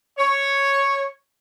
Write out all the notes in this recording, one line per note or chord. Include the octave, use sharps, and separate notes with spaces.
C#5